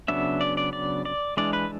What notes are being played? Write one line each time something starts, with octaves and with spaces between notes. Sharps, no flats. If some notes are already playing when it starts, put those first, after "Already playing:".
C#3 F#3 B3 D4 E5
D5
D5
D5
D5
E3 G#3 D4 D5
B4